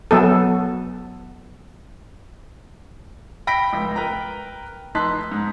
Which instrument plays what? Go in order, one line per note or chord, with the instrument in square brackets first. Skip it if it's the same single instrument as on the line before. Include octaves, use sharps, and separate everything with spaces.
[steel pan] F#3 B3 A4
[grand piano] G5 B5 A#6 B6 D7
F1 C#2
A#4 B4 G5 A#5
F1 D#4 A5 C6 F#6 B6
G#2